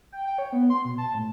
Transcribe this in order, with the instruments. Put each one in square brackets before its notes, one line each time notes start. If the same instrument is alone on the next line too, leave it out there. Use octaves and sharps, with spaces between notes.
[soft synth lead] G5
G5
C#5
B3
C6
B2
A5
A2